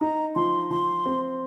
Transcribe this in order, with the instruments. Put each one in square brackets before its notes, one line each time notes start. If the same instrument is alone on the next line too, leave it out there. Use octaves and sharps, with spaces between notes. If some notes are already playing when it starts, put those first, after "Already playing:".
[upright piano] D#4 [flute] A#5
[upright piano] F3 [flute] C6
[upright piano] F3 [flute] C6
[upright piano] C4